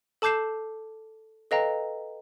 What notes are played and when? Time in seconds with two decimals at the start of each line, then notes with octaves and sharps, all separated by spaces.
0.22 A4 A5 D6 G6 C7 E7
1.51 A4 B4 D#5 F5 G5 A#5